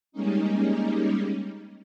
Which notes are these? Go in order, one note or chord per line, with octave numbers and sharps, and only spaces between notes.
G3 G#3 A#3 C#4 D#4